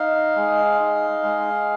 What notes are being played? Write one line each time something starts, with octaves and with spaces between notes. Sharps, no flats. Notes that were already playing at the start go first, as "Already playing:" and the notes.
Already playing: D#4 F5
G#3
D#4
G#3